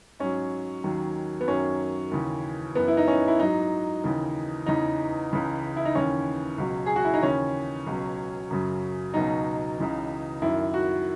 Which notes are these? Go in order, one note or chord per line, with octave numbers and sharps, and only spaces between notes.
G#2 F#3 C#4
D#2 D#3 F#3
B3
F#2 D#3 F#3 C#4
D#2 C#3 E3
F#2 E3 B3
E4
D#4
C#4
E4
G#2 F#3 D#4
D#2 C#3 E3
E2 C#3 E3 D#4
C#2 C#3 E3
E4
D#4
D#2 C#3 E3 C#4
C#2 B2 F#3
G#4
F#4
E4
D#4
D#2 C#3 E3 C#4
C#2 B2 F#3
F#2 C#3 F#3
C#2 B2 F#3 D#4
C#2 C#3 E3
F#2 D#3 F#3 E4
F#4